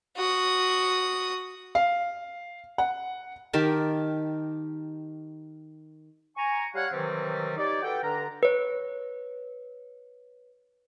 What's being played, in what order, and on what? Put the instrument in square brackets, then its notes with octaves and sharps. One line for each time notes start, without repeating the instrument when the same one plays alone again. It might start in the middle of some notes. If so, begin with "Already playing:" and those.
[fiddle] F#4 D#6
[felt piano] F5
F#5
[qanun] D#3 G4 A#4 A5
[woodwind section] G#5 A#5 C#6
G3 C#5 F5 F#5
C3 D#3 E3 F#3 G3 C4
D#4 G4 C#5 D5
F#4 A4 B4 G5
G2 D3 D4 A#5
[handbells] B4 C#5